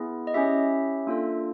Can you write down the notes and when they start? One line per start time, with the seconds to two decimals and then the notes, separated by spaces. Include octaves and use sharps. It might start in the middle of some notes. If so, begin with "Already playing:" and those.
Already playing: B3 E4 G#4
0.27 D#5
0.34 C#4 E4 G4 E5
1.07 A#3 D4 F4 A4